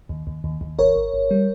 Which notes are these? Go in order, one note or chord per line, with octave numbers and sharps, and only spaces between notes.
D#2
D#2
D#2
D#2
G#1 A#4 C#5
G#1
G#1
G3